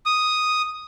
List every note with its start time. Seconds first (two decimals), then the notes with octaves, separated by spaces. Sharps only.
0.06 D#6